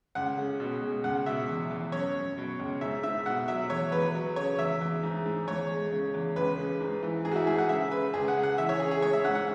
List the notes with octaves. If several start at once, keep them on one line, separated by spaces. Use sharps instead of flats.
C#2 F#5
C#3
B2
G#3
C#2 F#5
B2 E5
E2
E2
F#2 C#5
F#2
B2
C#2
G#2 E5
G#2 E5
B2 F#5
F#3 E5
E2 C#5
E2 B4
F#3
C#3 C#5
E2 E5
E2
G#2
G#2
E2 C#5
G#3
C#3
E2
C#2 B4
C#3
G#2
E3
G#2 G#4
F#4
E4
G#2 G#4
F#5
C#3 E5
C#3 B4
C#2 G#4
F#5
C#3
F#5
E3 E5
C#5
C#3 G#4
G#4
G#3 C#5
E5
G#2 F#5
F#5